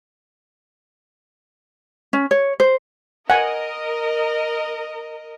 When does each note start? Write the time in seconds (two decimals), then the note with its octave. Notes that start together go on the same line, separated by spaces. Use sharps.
2.13 C#4
2.31 C#5
2.60 C5
3.30 A#4 D#5 F#5 G#5